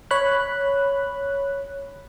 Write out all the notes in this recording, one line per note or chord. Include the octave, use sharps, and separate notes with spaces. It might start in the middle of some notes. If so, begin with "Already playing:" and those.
C#5 B5 F#6